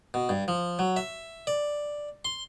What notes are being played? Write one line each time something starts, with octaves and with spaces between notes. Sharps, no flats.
B2
G2
F3
F#3
E5
D5
C6